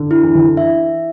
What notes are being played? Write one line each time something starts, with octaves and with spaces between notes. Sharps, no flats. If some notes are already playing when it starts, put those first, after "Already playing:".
Already playing: D3
E4
E3
D3
E3
E5